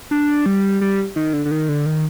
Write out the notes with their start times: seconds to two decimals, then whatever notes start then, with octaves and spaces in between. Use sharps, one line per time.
0.11 D4
0.46 G3
0.81 G3
1.16 D#3
1.33 D3
1.45 D3
1.51 D#3
1.69 D3
1.86 D#3